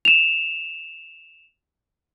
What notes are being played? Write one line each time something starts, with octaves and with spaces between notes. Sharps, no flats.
E7 F7